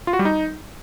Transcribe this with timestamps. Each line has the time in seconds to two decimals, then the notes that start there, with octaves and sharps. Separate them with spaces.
0.07 F4
0.13 F#4
0.19 G3
0.25 D#4